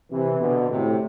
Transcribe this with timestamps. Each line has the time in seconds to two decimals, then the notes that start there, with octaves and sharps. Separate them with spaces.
0.11 C3 E3
0.41 B2 D3
0.70 A2 C3